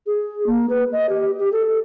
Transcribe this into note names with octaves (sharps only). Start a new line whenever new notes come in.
G#4
A#3
B4
D#5
G4
G4
A4